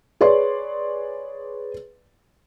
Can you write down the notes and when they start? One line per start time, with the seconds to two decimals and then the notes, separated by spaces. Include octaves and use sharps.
0.21 G#4 B4 C#5 D5 C6